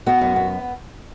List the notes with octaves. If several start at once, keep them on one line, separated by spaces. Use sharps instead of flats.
B3 F#4
F#2
B3